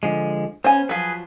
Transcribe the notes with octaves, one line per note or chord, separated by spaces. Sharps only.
D3 F3 G#3
B3 C#4 C5 G#5
F3 F#3 G#4 B4